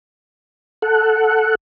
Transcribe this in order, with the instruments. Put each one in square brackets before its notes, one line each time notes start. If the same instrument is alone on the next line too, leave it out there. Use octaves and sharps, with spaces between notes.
[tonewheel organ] A4 F#5